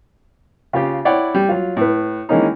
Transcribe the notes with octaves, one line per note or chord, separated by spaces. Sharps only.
C#3 F4 G4
E4 C#5 D5 F#5 G5 C#6
G3
F#3 F4
A2 B4
D#3 E3 G#3 A#3 C#4 D#4